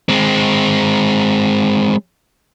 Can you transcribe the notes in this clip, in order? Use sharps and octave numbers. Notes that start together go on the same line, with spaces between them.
G#3 C4